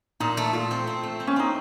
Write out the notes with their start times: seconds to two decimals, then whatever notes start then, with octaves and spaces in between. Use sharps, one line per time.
0.20 A#2 D#4
0.37 A3
0.53 A3 F4
0.71 C4
0.87 C4
1.03 A3
1.20 C4
1.27 C#4
1.36 C4 D#4